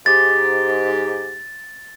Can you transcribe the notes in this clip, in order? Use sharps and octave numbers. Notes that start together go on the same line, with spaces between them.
G#2 G4 A6